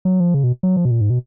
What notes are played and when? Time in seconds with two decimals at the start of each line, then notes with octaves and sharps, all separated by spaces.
0.05 F#3
0.20 F3
0.34 C#3
0.44 B2
0.63 F#3
0.77 F3
0.85 B2
0.91 A#2
1.01 G#2
1.10 B2